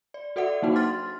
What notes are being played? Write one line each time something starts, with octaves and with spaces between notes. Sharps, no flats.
D5
F#4 A4 D5 E5 F#5
F#3 A#3 D4 D#4 F#4 G5
C6 F6 A6